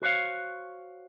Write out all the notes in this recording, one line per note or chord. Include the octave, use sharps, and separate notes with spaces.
F#4 C5 C#5 F5